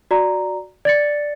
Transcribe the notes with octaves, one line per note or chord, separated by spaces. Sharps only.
F#4 D5 A#5
D5 A6 C#7